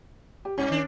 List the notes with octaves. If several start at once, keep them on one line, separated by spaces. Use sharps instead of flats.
G4
G2 C#4
D#3 D4